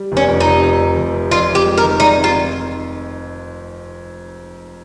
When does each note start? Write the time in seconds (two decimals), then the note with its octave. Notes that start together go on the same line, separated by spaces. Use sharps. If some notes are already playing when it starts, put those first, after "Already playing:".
Already playing: G3
0.12 F1 C#4
0.28 F2
0.40 D#4
0.46 C3
0.63 F2
0.79 C3
0.97 F1
1.14 C3
1.31 F2 F4
1.48 F2
1.55 G4
1.66 G#3
1.78 A#4
1.83 D#3
2.00 G#3 D#4
2.17 C4
2.24 F4
2.35 D#3